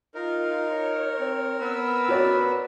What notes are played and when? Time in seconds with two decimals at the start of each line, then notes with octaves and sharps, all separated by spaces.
0.15 D#4 F4 A#4
0.72 C#5
1.19 C4
1.60 B3 B4 E6
2.08 F#4 C#5 D5